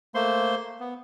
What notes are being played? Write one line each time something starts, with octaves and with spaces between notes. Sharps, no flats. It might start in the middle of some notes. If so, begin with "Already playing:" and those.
A3 A#3 C5 C6
B3